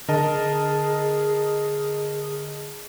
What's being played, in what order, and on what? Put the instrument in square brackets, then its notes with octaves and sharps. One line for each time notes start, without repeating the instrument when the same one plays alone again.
[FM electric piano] D3 [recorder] G#4 [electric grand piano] A#4 D#5 A5